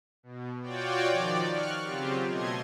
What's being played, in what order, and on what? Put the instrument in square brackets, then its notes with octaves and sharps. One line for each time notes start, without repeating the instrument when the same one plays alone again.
[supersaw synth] B2
F4 F#4 C#5 D5 G5
D#3 F3 D5
C#6 F6 F#6
C#3 F#3 C4 F4 G4
B2 A3 D#5 C6 G#6